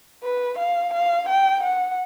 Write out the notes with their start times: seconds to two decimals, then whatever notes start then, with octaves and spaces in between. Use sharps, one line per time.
0.23 B4
0.58 F5
0.93 F5
1.28 G5
1.63 F#5